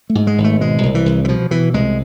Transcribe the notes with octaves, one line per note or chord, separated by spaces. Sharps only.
A3
G#2
G#3
G#1
A3
B2 G#3
C2
E3
C2
E3
B2 F3
B2 E3
C2 G#3